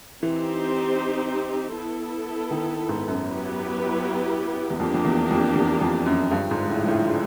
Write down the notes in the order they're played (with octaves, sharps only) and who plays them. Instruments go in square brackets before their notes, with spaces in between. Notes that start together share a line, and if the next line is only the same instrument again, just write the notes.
[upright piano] E3 [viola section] C4 D#4 G4 C5
[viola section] B3 E4 A4
[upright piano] D#3
G#2
F#2
[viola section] F#3 B3 E4 G4 B4
[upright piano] E2
[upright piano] F2 [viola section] A#3 D4 G4
[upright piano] F2
E2
F2
E2
F2
F#2
[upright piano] G2 [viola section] D3 F3 G#3
[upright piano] G#2
A2
A2